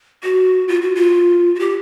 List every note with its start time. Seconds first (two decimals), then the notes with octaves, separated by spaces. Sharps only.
0.23 F#4
0.68 F4
0.81 F#4
0.95 F4
1.55 F#4
1.59 G4